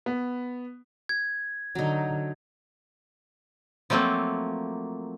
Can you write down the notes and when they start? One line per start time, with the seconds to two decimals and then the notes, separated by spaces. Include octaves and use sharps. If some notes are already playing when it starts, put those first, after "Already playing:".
0.06 B3
1.09 G#6
1.75 D3 F#3 D#4
3.90 F3 F#3 A3 A#3 C4